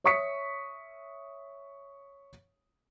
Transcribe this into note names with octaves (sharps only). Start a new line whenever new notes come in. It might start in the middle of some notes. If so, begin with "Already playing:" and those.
C#5 E5 C#6 D#6 B6 C#7